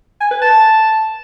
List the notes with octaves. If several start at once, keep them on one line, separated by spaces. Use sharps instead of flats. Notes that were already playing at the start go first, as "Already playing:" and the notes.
G#5
B4
A5